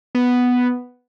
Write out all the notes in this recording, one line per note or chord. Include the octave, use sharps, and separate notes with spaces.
B3